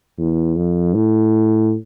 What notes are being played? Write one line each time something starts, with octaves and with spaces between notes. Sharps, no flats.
E2
F2
A2